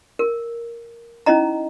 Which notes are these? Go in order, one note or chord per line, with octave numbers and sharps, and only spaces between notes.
A#4
C#4 D#4 E4 D#5 A#5